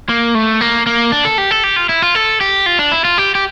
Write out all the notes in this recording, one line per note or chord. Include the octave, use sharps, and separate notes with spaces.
A#3
A3
A#3
A#3
D4
A4
G4
A4
G4
F4
E4
F4
A4
G4
F4
D4
E4
F4
G4
G4